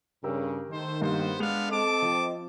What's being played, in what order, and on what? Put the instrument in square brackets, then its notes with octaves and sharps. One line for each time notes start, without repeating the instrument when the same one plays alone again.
[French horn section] G2 C#3 [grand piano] G4 A#4 E6
[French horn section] D#3 [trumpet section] A3 C5
[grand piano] G2 A#3 [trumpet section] B3 C5
[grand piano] G#3 F7 [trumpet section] B3 D4 F5
[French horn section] C4 A4 D#5 [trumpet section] A5 D6
[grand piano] F3